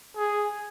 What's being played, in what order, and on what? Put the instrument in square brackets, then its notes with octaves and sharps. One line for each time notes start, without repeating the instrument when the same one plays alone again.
[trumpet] G#4